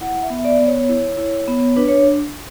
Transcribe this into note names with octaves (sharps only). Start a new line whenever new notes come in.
E4 F#5
E5
B3
E5
D5
B3
C#5
E4
E4
B3
D4 B4
C#5